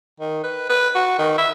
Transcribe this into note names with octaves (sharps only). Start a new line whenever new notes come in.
D#3
B4
B4
F#4
D#3
E5